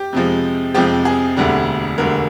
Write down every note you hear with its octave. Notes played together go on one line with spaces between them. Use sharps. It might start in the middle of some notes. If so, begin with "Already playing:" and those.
Already playing: G4
F2 C3 F3 G#3
F2 C3 F3 G#3 G4
G#4
E1 D2 D3 G3
E1 D2 D3 G3 A#4